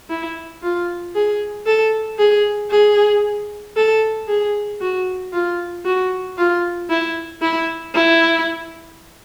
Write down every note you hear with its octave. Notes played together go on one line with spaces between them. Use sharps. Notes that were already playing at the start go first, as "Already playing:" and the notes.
E4
F4
G#4
A4
G#4
G#4
A4
G#4
F#4
F4
F#4
F4
E4
E4
E4